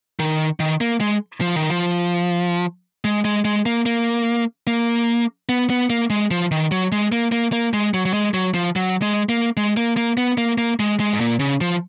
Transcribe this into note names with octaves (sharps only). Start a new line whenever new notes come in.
D#3
D#3
A#3
G#3
F3
D#3
F3
G#3
G#3
G#3
A#3
A#3
A#3
B3
B3
A#3
G#3
F3
D#3
F#3
G#3
A#3
A#3
A#3
G#3
F#3
F#3
G#3
F#3
F3
F#3
G#3
A#3
G#3
A#3
A#3
B3
A#3
A#3
G#3
G#3
G#2
A#2
C#3
F3